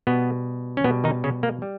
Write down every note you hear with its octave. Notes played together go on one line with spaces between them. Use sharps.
B2 G3 B3
C#4
B2 G3 B3
D#3 D#4
C#3 C#4
A#3
G3